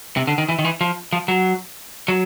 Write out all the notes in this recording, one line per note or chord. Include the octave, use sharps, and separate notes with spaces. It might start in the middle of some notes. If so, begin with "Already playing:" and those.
C3
D3
D#3
E3
D#3
E3
F3
F3
F#3
F#3